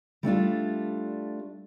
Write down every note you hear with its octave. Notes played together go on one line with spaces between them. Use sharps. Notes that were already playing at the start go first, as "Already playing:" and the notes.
G3 A3 D4 F4